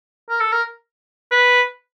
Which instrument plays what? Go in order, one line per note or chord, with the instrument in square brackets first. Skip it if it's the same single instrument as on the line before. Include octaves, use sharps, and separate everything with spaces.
[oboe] A#4
A4
A#4
B4